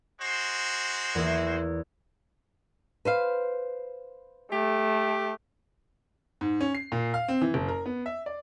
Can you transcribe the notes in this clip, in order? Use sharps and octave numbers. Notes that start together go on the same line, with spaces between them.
G#3 F#4 C5
E2 A#3 E4
B4 C5 F5
A3 G4
G#2
C#4
C7
A#2
F5
C4
E3
F#1
A#4
B3
E5
D5